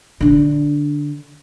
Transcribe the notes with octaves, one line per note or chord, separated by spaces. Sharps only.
D3 D4